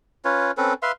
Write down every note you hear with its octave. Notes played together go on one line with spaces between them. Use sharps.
C#4 F4 B4 C#5
C4 C#4 A4 B4
B4 E5 F5 C6